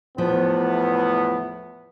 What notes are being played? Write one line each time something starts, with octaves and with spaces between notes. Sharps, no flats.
E2 A2 F3 B3